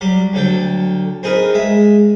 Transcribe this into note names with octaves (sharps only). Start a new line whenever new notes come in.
F#3 G3 D6
D2 F#3 A4 G5
C4 D#4 G#4 A#4 B4
G#3 E5